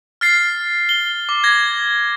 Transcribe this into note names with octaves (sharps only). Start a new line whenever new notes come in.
F6 A6 C7
G7
D6
G#6 A#6